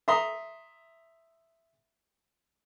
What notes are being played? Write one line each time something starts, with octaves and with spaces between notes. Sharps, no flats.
E5 A#5 C6 D#6